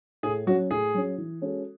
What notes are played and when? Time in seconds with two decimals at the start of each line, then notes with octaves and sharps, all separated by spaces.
0.23 A2 G#4
0.47 F#3 C#4 F#4
0.71 A2 G#4
0.94 F#3 C#4
1.18 E3
1.41 G#3 C#4 F#4 A4